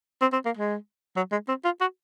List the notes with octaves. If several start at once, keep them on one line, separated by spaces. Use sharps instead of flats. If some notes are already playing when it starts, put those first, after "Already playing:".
C4
C4
A#3
G#3
F#3
G#3
C4
F4
F#4